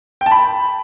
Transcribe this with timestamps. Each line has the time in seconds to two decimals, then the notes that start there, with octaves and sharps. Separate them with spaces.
0.21 G5
0.26 A5
0.31 B5